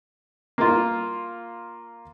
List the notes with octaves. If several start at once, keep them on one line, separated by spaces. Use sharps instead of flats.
A#3 F4